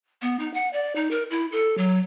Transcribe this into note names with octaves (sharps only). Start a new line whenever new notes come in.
B3
D#4
F#5
D5
D#4
A#4
E4
A4
F#3